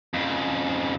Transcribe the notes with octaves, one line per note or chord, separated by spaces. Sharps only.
F2 C#3